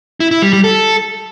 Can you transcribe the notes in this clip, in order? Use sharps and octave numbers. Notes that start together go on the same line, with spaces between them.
E4
E4
G3
G3
A4